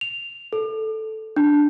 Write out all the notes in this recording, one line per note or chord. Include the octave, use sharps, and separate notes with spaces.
F7
A4
D4